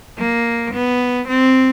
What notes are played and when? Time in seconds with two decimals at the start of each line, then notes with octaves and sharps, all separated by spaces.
0.18 A#3
0.74 B3
1.28 C4